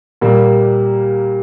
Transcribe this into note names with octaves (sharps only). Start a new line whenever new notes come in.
A#2 G3 A#3